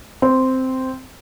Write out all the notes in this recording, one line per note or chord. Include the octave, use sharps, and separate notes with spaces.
C4